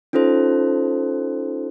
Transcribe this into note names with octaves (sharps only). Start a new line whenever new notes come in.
C#4 D#4 F4 A4 C5